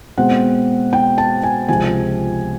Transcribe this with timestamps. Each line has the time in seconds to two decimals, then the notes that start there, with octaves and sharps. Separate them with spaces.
0.18 B2 G#3 C4 F#5
0.93 G5
1.18 A5
1.43 G#5
1.68 C#2 C3 F3 G#5